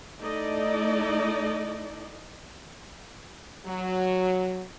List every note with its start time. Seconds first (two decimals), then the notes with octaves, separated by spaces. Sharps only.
0.20 A3 D#4 E4 A4 D5 D#5
3.66 F#3